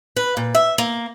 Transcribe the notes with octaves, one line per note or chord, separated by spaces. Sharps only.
B4
A#2
E5
A#3